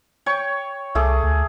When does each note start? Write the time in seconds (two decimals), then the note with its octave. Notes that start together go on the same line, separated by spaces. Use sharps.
0.26 C#5 G5 C#6
0.95 C2 A3 G#4 D6
1.23 D2